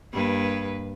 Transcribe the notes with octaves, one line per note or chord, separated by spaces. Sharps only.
G2 A#3 B4